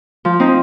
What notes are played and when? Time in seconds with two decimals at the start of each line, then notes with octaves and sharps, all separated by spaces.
0.25 F3
0.40 C4 D#4